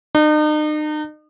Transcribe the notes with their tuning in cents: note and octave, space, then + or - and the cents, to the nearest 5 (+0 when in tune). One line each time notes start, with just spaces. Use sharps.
D#4 -40